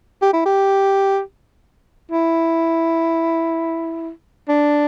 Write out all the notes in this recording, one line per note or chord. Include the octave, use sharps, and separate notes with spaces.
G4
E4
G4
E4
D4